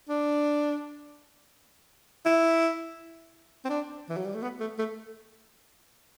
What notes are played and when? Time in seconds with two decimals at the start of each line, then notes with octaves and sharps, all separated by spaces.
0.09 D4
2.26 E4
3.65 C4
3.69 D4
4.09 E3
4.17 F#3
4.25 G3
4.34 A3
4.42 B3
4.60 A3
4.78 A3